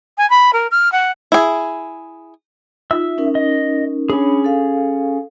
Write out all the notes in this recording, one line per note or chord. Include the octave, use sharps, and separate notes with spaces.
G#5
B5
A#4
F6
F#5
E4 G#4
D#4 F4 E5 E6
C#4 D#4 A#4
D#5
C#4 D4 G#4 C#5 B5
A4 F5